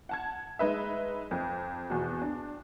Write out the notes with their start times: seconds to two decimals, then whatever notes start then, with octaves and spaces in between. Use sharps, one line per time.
0.09 F#5 A5 G#6
0.59 G#3 D#4 B4 E5
1.31 F2
1.90 E2 B2 F#4
2.22 D4